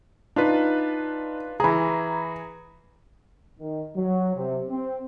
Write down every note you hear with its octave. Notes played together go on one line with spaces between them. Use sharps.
D4 D#4 F4 B4
E3 G#4 A#5 B5
D#3
F#3
C3
C4